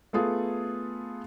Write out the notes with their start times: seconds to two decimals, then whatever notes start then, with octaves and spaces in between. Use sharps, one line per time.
0.13 A3 B3 F4 G#4 A4